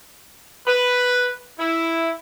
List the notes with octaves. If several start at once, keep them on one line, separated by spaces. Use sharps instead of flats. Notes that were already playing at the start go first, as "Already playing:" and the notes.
B4
E4